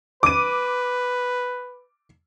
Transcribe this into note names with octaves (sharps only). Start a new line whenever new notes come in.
B4 D6 D#7